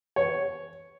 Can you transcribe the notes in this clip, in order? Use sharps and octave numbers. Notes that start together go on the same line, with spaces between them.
C#5